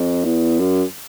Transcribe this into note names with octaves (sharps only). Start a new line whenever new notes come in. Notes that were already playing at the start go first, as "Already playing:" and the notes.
Already playing: F2
E2
F#2